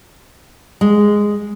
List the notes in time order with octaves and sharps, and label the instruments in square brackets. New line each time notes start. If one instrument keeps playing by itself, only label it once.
[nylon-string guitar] G#3